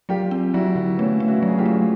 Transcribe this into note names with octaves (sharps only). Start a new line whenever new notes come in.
F#3 F4 G4
C4
F#3 E4 F#4
D3
A3 B3 C#4
A3
E4 F#4
F#3 G#4
F4 G4
A3